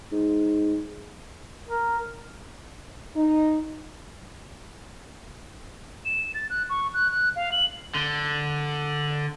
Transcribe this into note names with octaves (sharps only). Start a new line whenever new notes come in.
G#2
A#4
D#4
E7
A6
F#6
C#6
F#6
F#6
F5
F#7
D3